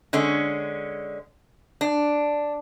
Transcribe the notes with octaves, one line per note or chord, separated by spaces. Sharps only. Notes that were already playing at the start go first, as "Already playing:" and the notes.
D3 G#3 C#4
D4